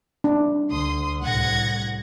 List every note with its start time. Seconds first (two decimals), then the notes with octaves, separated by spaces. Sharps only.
0.24 D4
0.71 D2 C6 D#6
1.23 C2 A2 F#5 G#6 A#6